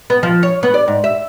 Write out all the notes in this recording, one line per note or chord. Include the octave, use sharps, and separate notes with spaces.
B3
F3
C#5
B3
D5
G#2
E5